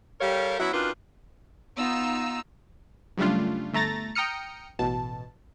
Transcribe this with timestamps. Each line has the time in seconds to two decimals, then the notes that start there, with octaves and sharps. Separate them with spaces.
0.21 G3 G4 A4 A#4 C#5 F5
0.59 F#3 B3 C#4 E4 F#4 E5
0.73 D#3 C#4 D4 F4 F#4 B4
1.77 B3 D#4 F4 E6
3.18 F#2 C#3 G3 A3 D4 F4
3.73 G1 A3 A#5 A6 A#6
4.15 G5 A#5 D#6 F6 C#7
4.79 A1 B2 A5